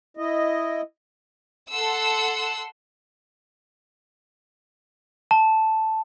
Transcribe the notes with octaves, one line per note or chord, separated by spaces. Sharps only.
E4 D#5
A4 F#5 C6 E6
A5